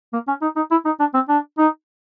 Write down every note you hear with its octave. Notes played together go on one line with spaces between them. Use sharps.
A#3
C#4
D#4
D#4
E4
D#4
D4
C4
D4
D#4